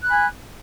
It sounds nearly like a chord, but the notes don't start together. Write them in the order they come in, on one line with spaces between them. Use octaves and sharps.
F#6 B5 G#5